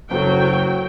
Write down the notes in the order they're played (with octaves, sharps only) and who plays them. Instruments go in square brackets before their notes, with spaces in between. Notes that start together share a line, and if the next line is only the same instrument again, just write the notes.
[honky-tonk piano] F#1 A4 [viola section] F#3 F#4 G5